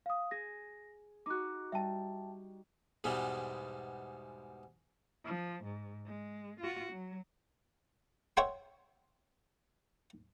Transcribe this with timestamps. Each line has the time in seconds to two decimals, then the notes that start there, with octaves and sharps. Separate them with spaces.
0.06 F5 D#6
0.31 G#4 A#6
1.26 D#4 F#4 D6 F#6
1.72 G3 E5 G5 A5
3.04 E2 G#2 B2 G3 G#3
5.25 F3
5.64 G#2
6.07 G#3
6.60 F4 F#4
6.93 F#3
8.37 C5 C#5 E5 F#5 G5 C6